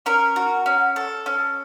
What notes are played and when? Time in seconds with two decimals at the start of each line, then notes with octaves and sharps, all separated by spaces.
0.06 C#4 A#4
0.36 F#4
0.66 C#4
0.96 A4
1.26 C#4